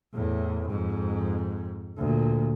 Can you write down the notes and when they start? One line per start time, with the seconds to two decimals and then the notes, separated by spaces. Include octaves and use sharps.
0.14 E2 A2
0.69 F2 G#2
1.97 D2 A#2